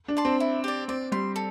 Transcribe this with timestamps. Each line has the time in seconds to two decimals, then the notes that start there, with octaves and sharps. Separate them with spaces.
0.08 D4
0.17 D5 A5 C6
0.25 C4
0.40 E4
0.64 G4 D5
0.88 C4 D5
1.12 G3 C6
1.36 A4